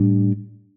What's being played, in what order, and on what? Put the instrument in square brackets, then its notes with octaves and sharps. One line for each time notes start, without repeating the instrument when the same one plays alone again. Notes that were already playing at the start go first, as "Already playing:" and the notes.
Already playing: [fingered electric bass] A2 G3 D4